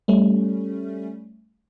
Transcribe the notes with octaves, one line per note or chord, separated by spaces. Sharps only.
G3 A3 C#4